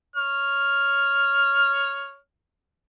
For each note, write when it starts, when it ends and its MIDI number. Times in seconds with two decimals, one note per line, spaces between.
0.16 2.16 73
0.16 2.16 89